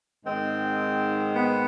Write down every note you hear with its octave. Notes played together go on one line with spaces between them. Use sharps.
G#2 D#3 G#3 C4
B3